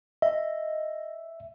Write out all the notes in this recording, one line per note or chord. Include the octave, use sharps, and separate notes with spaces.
D#5 E5